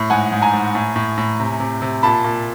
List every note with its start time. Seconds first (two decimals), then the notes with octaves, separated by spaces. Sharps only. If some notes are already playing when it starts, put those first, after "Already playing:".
Already playing: A2
0.10 G#2 F#5 G#5
0.32 G#2
0.42 G#5 A#5
0.53 G#2
0.75 A2
0.96 A2
1.18 A2
1.40 C3
1.60 C3
1.82 C3
2.03 A#2 A5 B5
2.24 A#2